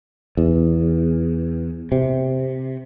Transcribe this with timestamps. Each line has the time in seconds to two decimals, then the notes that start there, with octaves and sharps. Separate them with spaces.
0.37 E2
1.92 C3